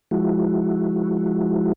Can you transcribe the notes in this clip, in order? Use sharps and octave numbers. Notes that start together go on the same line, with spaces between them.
F3 G#3 E4 F#4